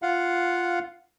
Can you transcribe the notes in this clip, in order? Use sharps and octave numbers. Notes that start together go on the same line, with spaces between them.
F4 F5 F#5